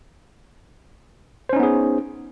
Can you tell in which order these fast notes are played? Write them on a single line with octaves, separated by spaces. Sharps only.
C5 C#4 D#4 B3 G#4